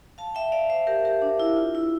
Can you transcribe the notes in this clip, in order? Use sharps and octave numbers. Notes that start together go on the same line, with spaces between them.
F5 A5
E5 G5
D5 F5
C5 E5
G4 A#4
G4 A#4
D4
E4
F4
E4